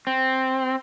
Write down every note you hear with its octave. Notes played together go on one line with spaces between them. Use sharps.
C4